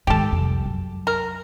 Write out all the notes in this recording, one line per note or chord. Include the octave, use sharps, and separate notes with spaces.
G#2 D#3 G4 A4
C2 F2
F#2
A#4